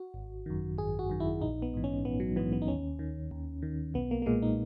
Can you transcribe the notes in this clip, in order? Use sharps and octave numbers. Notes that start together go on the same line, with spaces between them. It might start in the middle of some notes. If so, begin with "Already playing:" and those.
Already playing: F#4
G#1
F#2 D#3
G#1 G#4
F#4
F#2 D#3
E4
A#1 D#4
B3
G#2 E3
C#4
A#1 B3
F#3
G#2 E3 B3
B3
D#4
D#2 C#4
D#3
D#2
D#3
B1 B3
A#3
A#3
A#2 G#3
D#4